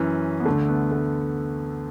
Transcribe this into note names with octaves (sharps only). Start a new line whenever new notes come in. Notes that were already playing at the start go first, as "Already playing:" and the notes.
Already playing: F#2 E3 C#4
B3
D2 D3 A3
B3
A3